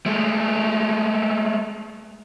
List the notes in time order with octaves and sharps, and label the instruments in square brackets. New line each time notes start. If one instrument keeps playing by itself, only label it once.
[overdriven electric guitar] G#3 A3